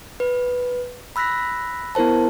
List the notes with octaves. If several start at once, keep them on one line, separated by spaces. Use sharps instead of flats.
B4
B5 E6 F#6 A#6 B6
B3 E4 A#4 C5 A5